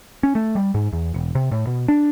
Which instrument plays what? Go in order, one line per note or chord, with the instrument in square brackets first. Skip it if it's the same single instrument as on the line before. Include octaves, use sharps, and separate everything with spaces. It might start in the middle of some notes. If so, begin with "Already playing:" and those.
[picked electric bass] C#4
A3
G3
G#2
E2
E1
C3
A2
B2
D4